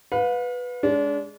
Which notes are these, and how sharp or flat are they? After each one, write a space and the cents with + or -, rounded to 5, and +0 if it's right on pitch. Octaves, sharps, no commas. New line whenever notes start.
B4 +0 F5 +40
G#3 +0 D4 -35